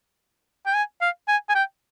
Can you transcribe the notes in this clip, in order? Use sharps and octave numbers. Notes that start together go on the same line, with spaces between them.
G5
G#5
F5
G#5
G#5
G5